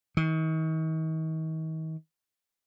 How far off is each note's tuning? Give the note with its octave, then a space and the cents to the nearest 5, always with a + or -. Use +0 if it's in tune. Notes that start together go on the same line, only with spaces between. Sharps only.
D#3 +40